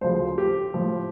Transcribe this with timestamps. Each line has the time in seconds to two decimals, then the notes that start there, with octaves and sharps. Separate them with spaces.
0.01 D2 C#3 F3 C5
0.38 G4
0.74 A2 F3